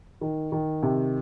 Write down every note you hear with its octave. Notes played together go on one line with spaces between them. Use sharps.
D#3
D#3
C3